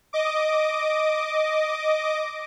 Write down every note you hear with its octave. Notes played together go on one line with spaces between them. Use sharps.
D#5 D6